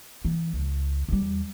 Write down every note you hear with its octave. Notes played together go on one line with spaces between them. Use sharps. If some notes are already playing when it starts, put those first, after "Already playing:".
E3
C#2
E2 G3